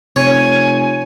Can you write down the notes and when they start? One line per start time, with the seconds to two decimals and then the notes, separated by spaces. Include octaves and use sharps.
0.16 F1 C3 C#5 G#5